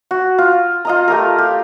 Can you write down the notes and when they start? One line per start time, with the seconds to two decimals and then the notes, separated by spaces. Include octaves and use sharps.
0.11 F#4
0.38 F4
0.85 F4 D#5 A#5
1.08 A3 G4 A#4
1.38 G4